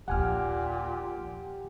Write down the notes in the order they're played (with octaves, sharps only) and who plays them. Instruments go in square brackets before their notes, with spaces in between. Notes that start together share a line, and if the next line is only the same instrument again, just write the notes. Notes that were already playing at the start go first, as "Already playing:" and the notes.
[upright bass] A#1 D#2 [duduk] A#2 [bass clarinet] G4 [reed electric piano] F#5 G#5 F6